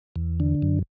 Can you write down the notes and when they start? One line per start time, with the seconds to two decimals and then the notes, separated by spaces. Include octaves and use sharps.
0.16 E2
0.40 D3
0.62 F#2